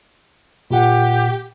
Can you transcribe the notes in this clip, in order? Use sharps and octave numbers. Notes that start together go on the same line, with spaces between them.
A#2 G4 F#5